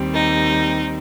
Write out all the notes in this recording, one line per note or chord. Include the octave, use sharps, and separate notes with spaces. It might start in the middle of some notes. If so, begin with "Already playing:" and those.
Already playing: D#2 D#3 G3 C4
D#4